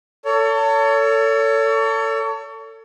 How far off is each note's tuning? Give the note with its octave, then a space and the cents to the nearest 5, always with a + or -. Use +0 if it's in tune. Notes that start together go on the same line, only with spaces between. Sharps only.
A4 +30 C#5 +30